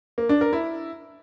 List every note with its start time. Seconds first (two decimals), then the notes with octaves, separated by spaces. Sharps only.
0.18 A#3
0.29 D4
0.41 A#4
0.53 E4